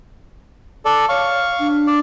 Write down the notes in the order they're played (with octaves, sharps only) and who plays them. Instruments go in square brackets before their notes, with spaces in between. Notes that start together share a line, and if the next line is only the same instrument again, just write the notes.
[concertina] A4 D5
[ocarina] C#5 [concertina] F5 C#6
[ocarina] D4
[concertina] D5